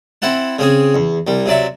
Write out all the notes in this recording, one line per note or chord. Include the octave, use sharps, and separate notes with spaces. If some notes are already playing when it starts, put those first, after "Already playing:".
C4 E4 F#5 A5
C#3 C4 G#4
E2
C2 G3
C3 F#3 D5 E5